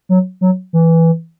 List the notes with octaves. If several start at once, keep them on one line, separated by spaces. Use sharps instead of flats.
F#3
F#3
E3